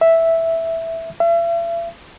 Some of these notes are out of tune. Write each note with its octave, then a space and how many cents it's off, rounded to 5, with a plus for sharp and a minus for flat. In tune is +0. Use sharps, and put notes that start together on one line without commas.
E5 -5
E5 +40